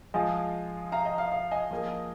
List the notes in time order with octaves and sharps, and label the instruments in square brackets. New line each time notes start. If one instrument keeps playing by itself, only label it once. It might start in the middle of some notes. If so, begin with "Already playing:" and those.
[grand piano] F3 G#3 F4 G#4 [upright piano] D#5 G#5
[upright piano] F5 A#5
D#5
F5
F5
D#5 G#5
[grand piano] F3 A#3 G#4